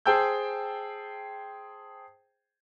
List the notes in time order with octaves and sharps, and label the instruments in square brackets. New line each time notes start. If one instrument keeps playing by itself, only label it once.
[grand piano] G#4 C5 G5 A5 E6 G6